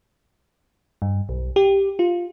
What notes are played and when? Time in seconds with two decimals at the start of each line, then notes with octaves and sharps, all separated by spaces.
1.02 G2
1.29 B1
1.56 G4
1.99 F4